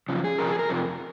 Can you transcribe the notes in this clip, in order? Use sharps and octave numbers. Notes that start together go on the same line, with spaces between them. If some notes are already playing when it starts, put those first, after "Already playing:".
F#2 C#3 F3
G#4
F2 C3 F3 A#4
G#4
A#4
F2 C3 F3